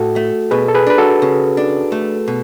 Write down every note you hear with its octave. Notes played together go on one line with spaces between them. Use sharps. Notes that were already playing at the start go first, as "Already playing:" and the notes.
Already playing: A2 F#4 A4
A3
B2 G#4 B4
A4
G#4 B4
D4 B4
F#4 A4
C#3
D4
A3
B2